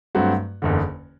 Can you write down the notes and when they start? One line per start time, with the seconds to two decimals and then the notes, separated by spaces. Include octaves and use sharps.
0.15 G2 F#3 A3 C4 F#4
0.62 F#1 E2 D3